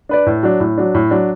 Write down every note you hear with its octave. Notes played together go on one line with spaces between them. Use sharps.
D4 B4 D5
A2
F#3 D4
A2
F#3 D4
A2
F#3 D4